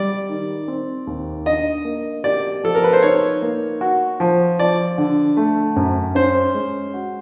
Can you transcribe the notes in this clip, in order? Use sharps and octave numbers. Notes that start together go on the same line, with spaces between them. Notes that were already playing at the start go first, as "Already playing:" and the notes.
Already playing: G3 D5
D#3
C4
D#2
D4 D#5
A#3
G4 D5
F3 A4
A#4
B4
C5
D#4 C#5
A#3
F#4
F3
F3 D5
D3
A3
F#2
C#4 C5
G#3
F#4